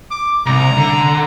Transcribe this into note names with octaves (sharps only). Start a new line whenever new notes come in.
D6
C2 A#5
D3